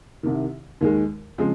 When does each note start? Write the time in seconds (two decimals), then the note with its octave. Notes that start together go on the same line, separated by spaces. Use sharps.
0.23 C2 C3 D#3
0.81 D#2 D#3 G#3
1.38 C#3 F3 G#3 C4